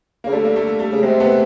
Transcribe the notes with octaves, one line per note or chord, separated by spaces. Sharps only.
C#3 A#3
D3 G3 A3
A#3
G3 A3
G3 A3
C#3
C3 G#3
A3 B3